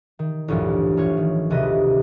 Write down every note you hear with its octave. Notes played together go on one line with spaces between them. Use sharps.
D#3
A1 D2 G2 A#2 F3
A1 F4 C#5
D#3
E1 D2 C3 F3 B4 D#5